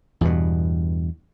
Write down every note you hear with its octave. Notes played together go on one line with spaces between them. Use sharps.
E2 G2 B2